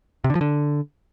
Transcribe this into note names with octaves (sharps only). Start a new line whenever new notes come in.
C3
D3
F3
D3